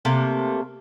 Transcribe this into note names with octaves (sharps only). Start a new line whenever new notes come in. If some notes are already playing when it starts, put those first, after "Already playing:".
C3 A3 A#3